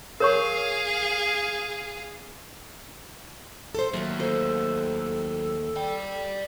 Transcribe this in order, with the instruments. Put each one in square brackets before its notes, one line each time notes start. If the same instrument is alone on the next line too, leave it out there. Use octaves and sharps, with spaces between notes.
[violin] G#4 F5 [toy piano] A#4 C#5 C#6
[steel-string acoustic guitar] A4 C5
[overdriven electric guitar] D#2 [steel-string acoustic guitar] F#3 A3 F4
[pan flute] A4 [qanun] C5
[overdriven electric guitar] D5 G5